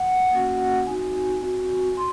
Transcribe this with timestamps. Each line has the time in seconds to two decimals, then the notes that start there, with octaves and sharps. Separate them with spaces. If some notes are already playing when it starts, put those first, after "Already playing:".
Already playing: F#5
0.31 A#3 C#4 F#4
0.86 C4 D#4 F#4 G#5
1.42 C4 F#4
1.97 F#4 C6